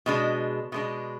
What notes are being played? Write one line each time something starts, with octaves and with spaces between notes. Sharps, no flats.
B2 G#3 D4
B2 G#3 D4